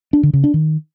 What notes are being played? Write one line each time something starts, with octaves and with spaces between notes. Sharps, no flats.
D4
D3
C#3
D4
D#3